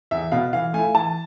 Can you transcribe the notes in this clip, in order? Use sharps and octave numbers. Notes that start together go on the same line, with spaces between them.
E2 E5
B2 B3 F5
E3 F5
A3 E4 G#5
E3 A5